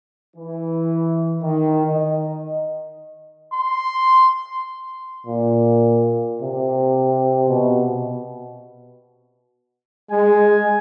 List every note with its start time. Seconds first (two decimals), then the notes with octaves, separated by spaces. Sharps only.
0.36 E3
1.42 D#3
1.87 D#5
3.53 C6
5.27 A#2
6.41 C3
7.49 B2
10.11 G#3 G#5